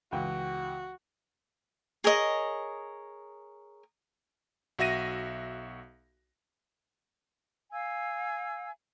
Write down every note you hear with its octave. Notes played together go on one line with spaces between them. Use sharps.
C#2 E3 F#4 G5
G#4 A#4 C#5 D#5
B1 F#4 E5 A#6 D#7
F5 G#5 E6